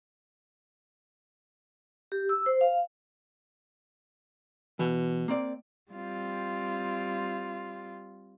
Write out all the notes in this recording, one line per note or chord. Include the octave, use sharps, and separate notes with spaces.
G4
E6
C5
F5
B2 E3
A#3 C4 D5
G3 C4 F4